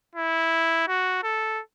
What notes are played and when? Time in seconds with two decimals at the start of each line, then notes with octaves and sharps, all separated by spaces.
0.15 E4
0.88 F#4
1.23 A4